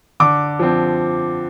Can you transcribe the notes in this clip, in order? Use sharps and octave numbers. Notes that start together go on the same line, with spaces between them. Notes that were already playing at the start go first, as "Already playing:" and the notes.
D3 D6
F3 C4